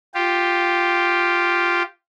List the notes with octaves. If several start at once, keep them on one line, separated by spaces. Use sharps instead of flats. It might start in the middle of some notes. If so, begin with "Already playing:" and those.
F4 G4